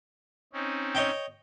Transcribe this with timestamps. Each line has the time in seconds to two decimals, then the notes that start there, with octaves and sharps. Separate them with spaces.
0.53 C4 C#4 D#4
0.95 C#5 D#5 G5